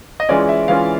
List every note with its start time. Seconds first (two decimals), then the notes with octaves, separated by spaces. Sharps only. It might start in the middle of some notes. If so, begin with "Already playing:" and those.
0.20 D#5
0.29 E3 G#3 C#4 F4 D5
0.49 E5
0.68 E3 G#3 C#4 F4 F5